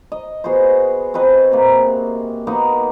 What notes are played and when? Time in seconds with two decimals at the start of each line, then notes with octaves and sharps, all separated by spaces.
0.12 D#5
0.44 B3 F#4 G#4 C5
1.14 C4 F#4 B4 D#5
1.52 C3 A#3
2.47 A#3 B3 D#4 F#4